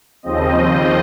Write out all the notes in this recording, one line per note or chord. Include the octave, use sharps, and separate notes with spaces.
D#2 C#3 F3 C4 D#5